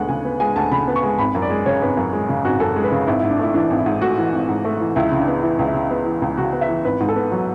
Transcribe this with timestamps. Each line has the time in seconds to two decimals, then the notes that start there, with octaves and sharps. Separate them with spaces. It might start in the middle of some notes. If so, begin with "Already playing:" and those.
Already playing: D2 G#3 B3 F#5
0.09 C#3 G#5
0.25 B3
0.40 G#3 G#5
0.56 D2 A5
0.72 C#3 B5
0.88 B3
0.96 C#6
1.03 G#3
1.19 G#1 B5
1.35 F#2
1.42 D5
1.50 G#3
1.66 C#3 C#5
1.82 G#1 B4
1.97 F#2
2.13 G#3
2.29 C#3
2.45 G#1 F#4
2.60 F#2 A4
2.76 G#3
2.84 B4
2.92 C#3
3.07 G#1 E4
3.19 G#2 E4
3.31 D4
3.39 A3 E4
3.54 E3 D4
3.70 G#1
3.79 E4
3.86 G#2
4.01 A3 F#4
4.18 E3
4.33 G#1
4.49 G#2
4.65 A3
4.81 E3
4.96 C#2 E4
5.12 C#3
5.19 D4
5.27 B3
5.43 E3 E4
5.59 C#2
5.67 E4
5.74 C#3
5.91 B3
6.06 E3
6.22 C#2
6.37 C#3 F#4
6.53 B3
6.61 E5
6.69 E3
6.85 G#1 B4
7.00 G#2
7.09 A4
7.16 B3
7.32 F#3